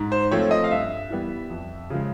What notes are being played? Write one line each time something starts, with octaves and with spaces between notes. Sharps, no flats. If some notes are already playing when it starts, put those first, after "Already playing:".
Already playing: G#2
C5
F3 A3 C4 C#5
D#5
F5
G2 E5
E3 G3 B3
F2
C#3 F3 G#3